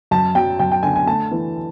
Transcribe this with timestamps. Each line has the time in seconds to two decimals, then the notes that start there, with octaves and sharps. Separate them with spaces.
0.11 F#2 A5
0.35 F#3 G5
0.59 F#2 G5
0.72 G5
0.83 D3 G#5
0.96 G#5
1.07 A3 A5
1.31 E3